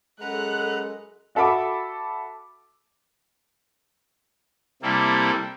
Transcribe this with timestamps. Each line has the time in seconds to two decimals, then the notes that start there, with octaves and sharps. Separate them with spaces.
0.21 F#2 G#3 A4 B4 F#5 A#5 F#6
1.35 F#4 A4 E5 B5 D6
4.82 C3 G3 A#3 E4 A4